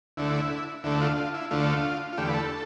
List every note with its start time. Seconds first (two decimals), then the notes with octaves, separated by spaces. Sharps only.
0.17 D2 D3 A3 E4
0.84 D2 D3 A3 E4
1.01 F4
1.18 F4
1.34 E4
1.51 D2 D3 A3 F4
2.13 F4
2.18 E2 D3 A3 G4
2.29 B4
2.34 A4